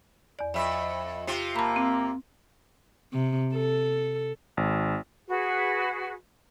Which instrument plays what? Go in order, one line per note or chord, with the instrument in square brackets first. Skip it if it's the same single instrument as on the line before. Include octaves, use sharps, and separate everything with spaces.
[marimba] E2 D5
[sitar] F2 E5
C3 F4
[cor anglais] A#3 [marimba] A5 B5
[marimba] C4
[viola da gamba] C3
A4
[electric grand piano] G#1
[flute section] F#4 G#4 B4